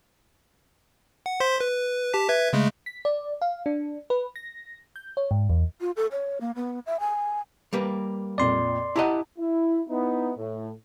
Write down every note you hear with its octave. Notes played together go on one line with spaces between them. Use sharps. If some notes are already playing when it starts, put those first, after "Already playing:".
F#5
C5 C6 B6
B4
G4 A5 B6
B4 E5 G#6
C#3 G#3 A3
B6
D5
F5
D4
B4
A#6
G6
C#5
G#2
E2
F4
A4
C#5
A#3
B3
E5
G#5
G3 A#3 B4
F2 A#2 D5 C6
E4 G4 D#5 F#5 A5 A#5
E4
B3 D#4 E4
A2